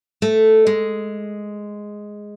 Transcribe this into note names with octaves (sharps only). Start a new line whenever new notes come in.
A3
G#3